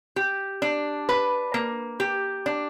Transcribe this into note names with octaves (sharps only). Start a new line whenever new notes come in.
G4
D4
B4
A#3
G4
D4